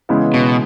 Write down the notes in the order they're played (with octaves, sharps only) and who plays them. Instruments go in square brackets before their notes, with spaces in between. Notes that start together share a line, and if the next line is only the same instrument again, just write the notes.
[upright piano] C#3 E3 G#3 B3
[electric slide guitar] B2